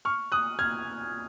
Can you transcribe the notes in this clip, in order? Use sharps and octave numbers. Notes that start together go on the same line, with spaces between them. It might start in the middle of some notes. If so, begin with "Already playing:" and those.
C#6 F6
D#6 F#6
F6 G#6